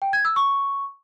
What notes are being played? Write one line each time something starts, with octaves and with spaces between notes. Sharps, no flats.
G5
G#6
E6
C#6